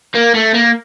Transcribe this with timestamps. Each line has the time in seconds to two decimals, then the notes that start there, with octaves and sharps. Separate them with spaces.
0.15 A#3
0.34 A3
0.54 A#3